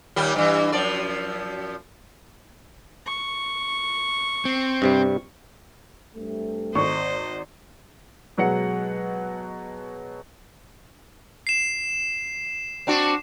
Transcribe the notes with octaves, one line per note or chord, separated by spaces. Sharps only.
D#2 A#2 G3
G2 E3
F#2 F3 D5
C#6
C4
G2 C3 G3
G2 C3 A3
G#1 C5 D#5 C#6
B2 F#3 G#3 F#5 C#7
C7 E7
C4 D4 F#4